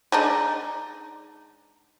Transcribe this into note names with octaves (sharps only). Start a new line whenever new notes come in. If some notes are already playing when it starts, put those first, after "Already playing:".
G#3 D4 D#4